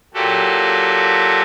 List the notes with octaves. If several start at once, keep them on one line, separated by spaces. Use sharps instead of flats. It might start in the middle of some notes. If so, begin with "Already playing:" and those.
A#2 F#3 F#4 G4 A4